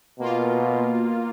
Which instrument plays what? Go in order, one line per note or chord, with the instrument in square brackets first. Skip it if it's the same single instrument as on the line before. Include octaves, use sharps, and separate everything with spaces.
[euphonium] B2 [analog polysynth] A#3 F4